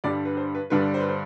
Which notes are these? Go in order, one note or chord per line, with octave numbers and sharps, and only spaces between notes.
G2 D3 G3 D4 D5
B4
C5
B4
G2 D3 G3 D4 B4
C5
B4
C5